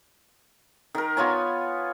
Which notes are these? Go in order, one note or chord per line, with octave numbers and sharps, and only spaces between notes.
D#3 A#4
B3 F4 C#5 G#5